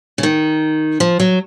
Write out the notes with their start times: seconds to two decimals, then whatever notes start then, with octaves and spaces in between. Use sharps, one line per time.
0.18 C#3
0.23 D#3
1.00 F3
1.20 F#3